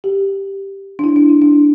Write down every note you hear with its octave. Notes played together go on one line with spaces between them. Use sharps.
G4
D4
E4
D4
E4
D4